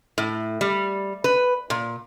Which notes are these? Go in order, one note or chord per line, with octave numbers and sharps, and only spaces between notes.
A2
G3
B4
A#2